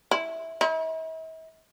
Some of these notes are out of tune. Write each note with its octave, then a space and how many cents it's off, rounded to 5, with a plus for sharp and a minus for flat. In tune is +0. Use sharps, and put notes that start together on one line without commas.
E4 -10
E4 -45